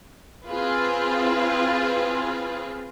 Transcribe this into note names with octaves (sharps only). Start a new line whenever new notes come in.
C4 F4 G#4 B4